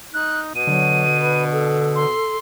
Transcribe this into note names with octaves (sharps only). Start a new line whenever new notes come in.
D#4 F#6
B2 D#7
D3 F#3
B4
A4
C6